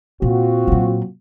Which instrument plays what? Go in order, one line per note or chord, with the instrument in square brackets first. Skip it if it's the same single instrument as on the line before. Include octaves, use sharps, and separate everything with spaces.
[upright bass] A#2 [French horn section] C4 F4 F#4
[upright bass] A#2 F#3